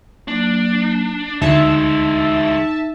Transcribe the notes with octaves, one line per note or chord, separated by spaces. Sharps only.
F#3 A#3 D4
D2 E3 G#3 D#4 E5 A5